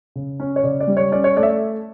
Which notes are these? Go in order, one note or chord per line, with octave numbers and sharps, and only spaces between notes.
C#3
C#4
C#5
C#3 D5
D5
G3
C#5
C#4 D5
C#5
A3 D5
E5